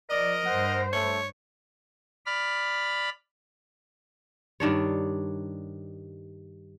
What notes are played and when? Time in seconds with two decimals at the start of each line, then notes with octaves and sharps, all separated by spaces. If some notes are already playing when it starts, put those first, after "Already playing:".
0.10 F3 A#4 D5 D#5
0.46 G2 C5 F#5
0.93 A3 C#5
2.26 D5 B5 F6
4.60 G2 D#3 D4 C#5